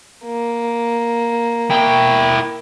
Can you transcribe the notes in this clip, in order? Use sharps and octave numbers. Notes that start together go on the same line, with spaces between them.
A#3
E4 G5